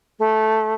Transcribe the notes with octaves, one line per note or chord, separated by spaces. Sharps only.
A3